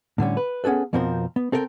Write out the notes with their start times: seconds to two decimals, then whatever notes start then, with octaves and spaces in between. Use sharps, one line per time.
0.18 A2 D3 G3 C#4
0.37 B4
0.64 B3 C#4 G#4 A4 B4
0.93 F2 B2 F3 C4 A#4 C5
1.36 B3
1.52 C4 A4 A#4 F5 G5